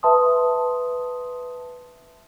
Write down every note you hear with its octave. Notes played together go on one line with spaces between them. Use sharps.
B4 E5 A5 C6 D#6